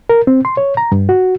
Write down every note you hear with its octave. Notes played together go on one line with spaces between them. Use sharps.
A#4
C4
C6
C#5
A#5
G2
F#4